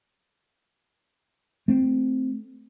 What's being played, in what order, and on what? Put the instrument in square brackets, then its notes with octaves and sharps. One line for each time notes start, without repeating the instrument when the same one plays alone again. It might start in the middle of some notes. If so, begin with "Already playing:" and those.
[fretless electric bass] A3 C4